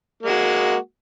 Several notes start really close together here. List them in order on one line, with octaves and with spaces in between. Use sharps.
A#3 G#3 F#4